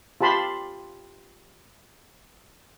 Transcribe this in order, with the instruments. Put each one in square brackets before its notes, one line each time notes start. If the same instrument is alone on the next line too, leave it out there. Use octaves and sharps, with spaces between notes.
[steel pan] F4 G4 A5 B5 C6